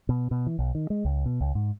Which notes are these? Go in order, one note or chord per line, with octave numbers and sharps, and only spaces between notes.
B2
B2
E3
B1
D#3
G#3
C#2
B2
C#2
G#2